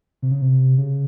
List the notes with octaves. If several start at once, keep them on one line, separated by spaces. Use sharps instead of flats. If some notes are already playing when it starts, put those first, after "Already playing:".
C3
C#3
C3
C#3